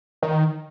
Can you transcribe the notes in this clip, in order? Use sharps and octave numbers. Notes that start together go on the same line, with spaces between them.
D#3